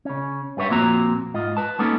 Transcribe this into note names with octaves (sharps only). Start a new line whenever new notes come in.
C#3 C#4
G2 G3 B4 C#5 E5 F#5
F2 A#2 A#3 C4 F#4 A#5
G#2 F4 D#5
B4 A5
G#3 A#3 B3 C#4 D#4 A4